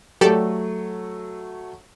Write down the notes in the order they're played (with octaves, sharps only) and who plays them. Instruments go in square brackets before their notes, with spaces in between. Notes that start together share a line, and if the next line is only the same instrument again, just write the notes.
[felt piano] F#3 A3 [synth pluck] G4 A4 D5